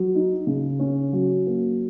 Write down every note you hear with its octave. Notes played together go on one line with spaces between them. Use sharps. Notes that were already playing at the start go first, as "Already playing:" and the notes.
Already playing: F#3
D#4
C#3
C#4
F#3
A#3